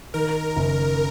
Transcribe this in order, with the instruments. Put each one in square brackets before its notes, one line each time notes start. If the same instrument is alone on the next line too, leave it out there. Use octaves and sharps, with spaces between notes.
[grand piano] D#3 [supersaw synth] A#4
[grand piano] F#1